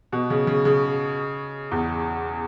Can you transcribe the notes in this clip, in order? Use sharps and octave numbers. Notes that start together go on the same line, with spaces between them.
B2
C#3
C#3
C#3
E2